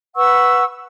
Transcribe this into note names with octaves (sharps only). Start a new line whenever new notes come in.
B4 F#5 C#6 E6